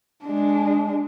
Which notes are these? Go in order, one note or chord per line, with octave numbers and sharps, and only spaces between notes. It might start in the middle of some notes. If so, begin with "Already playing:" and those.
G#3 D4